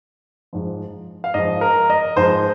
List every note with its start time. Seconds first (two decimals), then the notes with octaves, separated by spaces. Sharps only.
0.53 G#2 F3
1.24 F5
1.34 G#2 F3 D#5
1.61 A#4
1.90 D#5
2.16 G#2 F3 C5